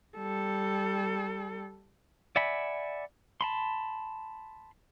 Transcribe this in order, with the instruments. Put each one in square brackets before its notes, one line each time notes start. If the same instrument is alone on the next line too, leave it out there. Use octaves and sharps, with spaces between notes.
[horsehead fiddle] G3 A4
[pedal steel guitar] D5 E5 F#5 G#5 B5
A5 B5 C6